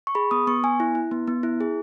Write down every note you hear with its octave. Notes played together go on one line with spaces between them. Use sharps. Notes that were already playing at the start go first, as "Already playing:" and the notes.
C#6
G#4 B5
B3 D#6
B3 C#6
B3 G#5
E4
E4
B3
B3
E4
G#4